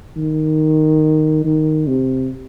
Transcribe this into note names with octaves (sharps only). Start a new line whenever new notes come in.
D#3
D#3
C3